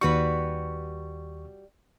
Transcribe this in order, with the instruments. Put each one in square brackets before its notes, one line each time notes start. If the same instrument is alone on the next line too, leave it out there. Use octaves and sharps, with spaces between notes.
[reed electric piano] D#2 C#6 [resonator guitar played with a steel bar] G3 F#4 B4